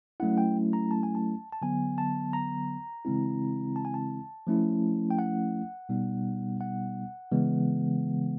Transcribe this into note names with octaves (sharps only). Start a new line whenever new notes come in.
F#3 A3 C#4 E4 F#5
G5
A#5
A5
G#5
A5
A5
D3 F#3 B3 G#5
A5
A#5
C#3 E3 G#3 C4 E4
A5
G#5
A5
F3 A3 C#4 E4
G5
F#5
B2 G3 B3 D#4
F#5
C#3 E3 G#3 B3